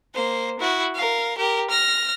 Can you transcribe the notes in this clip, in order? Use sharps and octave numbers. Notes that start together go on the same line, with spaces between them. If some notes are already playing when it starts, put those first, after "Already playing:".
A#3 C5
E4 F#4
A#4 F5
G4 A#4
F6 A#6